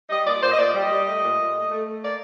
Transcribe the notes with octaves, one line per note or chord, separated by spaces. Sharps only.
G3 D#5
A#2 D5
A#2 C5
D#5
A#2 D5
G3
D#5
G3
A3 D#5
A#2
A#2
A3
A3
A3
A#3 D5